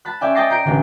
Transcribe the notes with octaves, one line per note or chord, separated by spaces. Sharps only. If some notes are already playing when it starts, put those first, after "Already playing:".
A5 B5 F#6
C#4 D5 E5 G5 G#5
D#5 G5 A5 D6 A#6 C7
A#5 G6 C7 D7
A1 D3